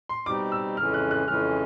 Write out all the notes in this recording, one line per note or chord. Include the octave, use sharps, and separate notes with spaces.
C6
B2 G3 C4 D#4 G4 D6
E6
F2 C#3 E3 G#3 C#4 F6
F#6
F#6
F2 C#3 E3 G#3 C#4 F6